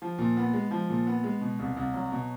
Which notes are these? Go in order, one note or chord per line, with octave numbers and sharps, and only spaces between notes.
F3
A#2
B3
G#3
F3
A#2
B3
G#3
B2
C2
C2
F#3
B2